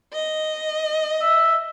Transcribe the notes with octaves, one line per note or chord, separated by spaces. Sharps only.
D#5
E5